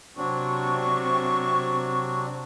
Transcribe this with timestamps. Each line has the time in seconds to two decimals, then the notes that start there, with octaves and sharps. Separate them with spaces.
0.17 C3 F#3 C4 D4 C#6